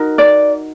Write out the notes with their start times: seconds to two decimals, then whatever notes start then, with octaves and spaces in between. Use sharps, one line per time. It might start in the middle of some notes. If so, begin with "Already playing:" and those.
Already playing: D#4 F#4 A#4
0.18 D5